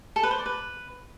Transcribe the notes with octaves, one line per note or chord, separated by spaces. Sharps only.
A4
B4
C5
D5
B4